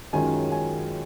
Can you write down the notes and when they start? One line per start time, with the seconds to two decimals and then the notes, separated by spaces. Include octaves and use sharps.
0.13 F#2 D#3 G#3 C#4 F4 G#5
0.52 G#5